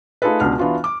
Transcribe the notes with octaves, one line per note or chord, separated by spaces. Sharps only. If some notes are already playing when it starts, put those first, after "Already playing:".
A3 D#4 F4 G#4 A4 B4
C#2 B2 D4 F#5 F6
E3 B3 D4 F4 F#4
D6